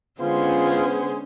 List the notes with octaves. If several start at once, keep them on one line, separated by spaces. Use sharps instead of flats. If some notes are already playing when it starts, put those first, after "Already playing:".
D3 G#3 B3 C#4 F4 G#4 C5